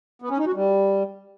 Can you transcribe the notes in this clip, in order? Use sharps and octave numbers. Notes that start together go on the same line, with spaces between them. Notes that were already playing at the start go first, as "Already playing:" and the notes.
B3
C#4
D#4
F#4
G3